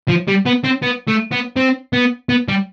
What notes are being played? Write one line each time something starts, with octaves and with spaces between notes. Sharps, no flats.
F3
G3
B3
C4
B3
A3
B3
C4
B3
B3
G3